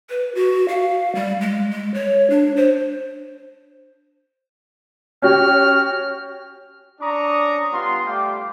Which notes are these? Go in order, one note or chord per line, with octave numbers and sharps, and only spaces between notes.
B4
F#4
F5
G3
G#3
G#3
C#5
D4
C5
C#4 F#4 G4 F6
C#4 D4 D5 A#5 C#6 D#6
G3 B3 F4 C6
G3 A3 F5 G5 D6